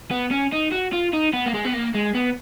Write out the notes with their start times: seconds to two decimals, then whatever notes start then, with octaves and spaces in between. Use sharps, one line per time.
0.11 B3
0.31 C#4
0.52 D#4
0.72 F#4
0.92 F4
1.13 D#4
1.33 B3
1.46 A#3
1.54 G#3
1.64 B3
1.73 A#3
1.94 G#3
2.14 B3